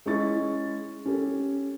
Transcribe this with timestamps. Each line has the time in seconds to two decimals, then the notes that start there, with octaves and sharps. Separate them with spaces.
0.06 G#3 C#4 E4 C#6 A6
1.06 C#4 G4 A4